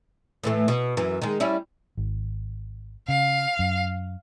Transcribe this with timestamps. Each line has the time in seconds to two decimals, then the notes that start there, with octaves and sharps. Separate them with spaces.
0.43 A2 E3 A3
0.68 B2
0.97 F#2 E3
1.22 D#3 G#3
1.40 G3 C#4 E4
1.97 G#1
3.08 C#3 F5
3.59 F#2